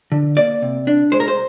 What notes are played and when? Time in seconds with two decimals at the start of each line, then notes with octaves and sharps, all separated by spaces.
0.12 D3
0.37 A#3 D5
0.62 C3
0.87 D4
1.12 G#3 C5
1.20 A#4
1.28 C5